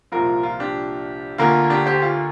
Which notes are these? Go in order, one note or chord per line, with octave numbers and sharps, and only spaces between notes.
C2 A#2 F3 F4 A#4
F4
D4 G4
D2 D3 A#3 F4 A#4
D4 G4
G4 C5
F4